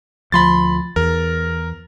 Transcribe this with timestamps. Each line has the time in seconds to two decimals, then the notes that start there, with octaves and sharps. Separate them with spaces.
0.32 D2 F3 B5 C6 A6
0.96 E2 A#4